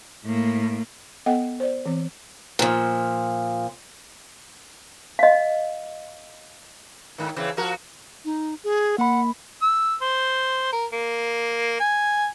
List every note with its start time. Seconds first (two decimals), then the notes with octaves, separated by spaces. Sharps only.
0.25 A2 A#3
1.26 B3 A4 D#5 F#5 G5
1.60 C5 D5
1.86 E3 C4
2.59 A#2 F3
5.19 D#5 F5
7.18 G#2 D#3
7.36 C#3 E3 C4
7.57 F3 F#4 A#4
8.25 D#4
8.64 G#4
8.98 A#3 F#5 B5
9.62 E6
10.01 C5
10.72 A#4
10.93 A#3
11.80 G#5